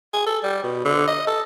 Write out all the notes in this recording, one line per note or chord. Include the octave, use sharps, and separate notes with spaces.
G#4
A4
G3
B2
D3
D#5
A4